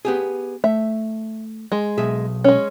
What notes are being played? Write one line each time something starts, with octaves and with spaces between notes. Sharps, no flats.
B3 G4 G#4
A3 E5
G#3
B1 G#4 E5
G#3 C#4